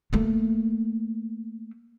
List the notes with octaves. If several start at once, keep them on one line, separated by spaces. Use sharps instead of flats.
A3 A#3